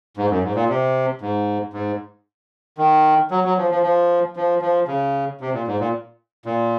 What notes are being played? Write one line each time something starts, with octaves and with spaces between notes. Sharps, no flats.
G#2
F#2
G#2
A#2
C3
G#2
G#2
D#3
F#3
F#3
F3
F3
F3
F3
F3
C#3
C3
A#2
G#2
A#2
A#2